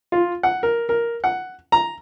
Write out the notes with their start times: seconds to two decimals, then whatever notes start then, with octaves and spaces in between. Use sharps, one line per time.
0.12 F4
0.43 F#5
0.63 A#4
0.89 A#4
1.24 F#5
1.72 A#5